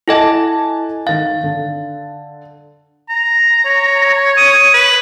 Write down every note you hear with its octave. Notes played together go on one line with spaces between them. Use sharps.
E4 A4 D#5 F#5 G#5 A5
D#3 F5 A6
D3
A#5
C#5
D#6
B4